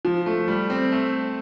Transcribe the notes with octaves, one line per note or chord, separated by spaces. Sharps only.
F3
A3
G3
C4
A3